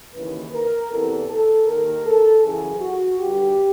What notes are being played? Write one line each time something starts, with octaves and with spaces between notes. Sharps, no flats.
D#2 C#3 E3 B4
A#4
E2 C3 E3 A4
A4
D#2 D#3 A#4
A4
F#2 C#3 E3 G#4
F#4
G2 D3 G4